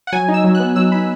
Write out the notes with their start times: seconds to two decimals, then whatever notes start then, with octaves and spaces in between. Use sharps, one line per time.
0.07 F#5
0.13 F#3 G#5
0.28 D#4
0.34 E6
0.44 F#3
0.55 B3 F#6
0.76 F#3 E6
0.91 D#4 B5